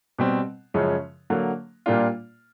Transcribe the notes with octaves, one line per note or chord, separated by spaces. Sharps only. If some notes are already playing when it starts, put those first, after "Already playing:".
B2 G3 C4
F#2 C#3 F3 G#3 C#4
D3 F#3 A#3
A#2 G3 A#3 D4 F4